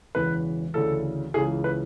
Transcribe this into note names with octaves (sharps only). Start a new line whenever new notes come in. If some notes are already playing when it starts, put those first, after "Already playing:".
E1 E2 C#3 E3 B4
D2 C#3 E3 A4
C#2 C#3 E3 G#4
B4